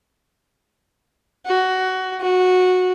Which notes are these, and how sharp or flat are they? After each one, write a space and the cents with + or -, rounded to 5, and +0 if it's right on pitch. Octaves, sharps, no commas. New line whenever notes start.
F#4 +15
F#4 -15